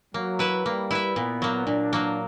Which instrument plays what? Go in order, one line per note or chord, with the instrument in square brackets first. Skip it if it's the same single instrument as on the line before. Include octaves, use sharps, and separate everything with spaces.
[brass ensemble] F#3 [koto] A#3
[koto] E4 B4 E5
[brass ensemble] G3 [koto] A#3
[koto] E4 B4 E5
[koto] A#2 [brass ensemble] B3
[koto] F#3 A#3
[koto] A#2 [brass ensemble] D4
[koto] F#3 A#3